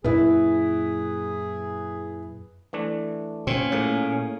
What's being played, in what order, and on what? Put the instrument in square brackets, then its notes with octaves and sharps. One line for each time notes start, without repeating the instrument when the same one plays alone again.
[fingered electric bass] F#2 A#2 [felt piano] E4 B4 [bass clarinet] G#4
[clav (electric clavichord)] E3 A3 D4
[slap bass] A#2 [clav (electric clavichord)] C4 [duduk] C#4 [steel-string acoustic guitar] C#5
[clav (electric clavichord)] A2 [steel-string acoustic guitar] A#3 G#4